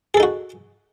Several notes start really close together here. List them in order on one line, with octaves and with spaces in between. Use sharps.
G#4 A4 D#4 F#4